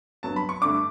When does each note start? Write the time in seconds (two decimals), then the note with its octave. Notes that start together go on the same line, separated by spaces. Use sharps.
0.23 G2 F#3 B3 A5
0.36 B5
0.49 C#6
0.61 G2 D3 A3 D4 D6